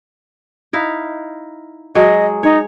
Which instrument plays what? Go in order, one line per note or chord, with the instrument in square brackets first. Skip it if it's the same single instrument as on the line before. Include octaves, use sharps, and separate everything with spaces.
[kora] D#4 E4 F5
[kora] F#3 G#3 G#4 [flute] D#5
[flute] D#4 [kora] C#5